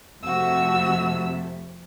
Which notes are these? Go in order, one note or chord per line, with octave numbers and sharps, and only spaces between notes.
F2 C3 A3 F#4 E6